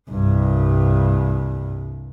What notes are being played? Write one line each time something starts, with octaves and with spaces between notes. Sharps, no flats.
C2 G2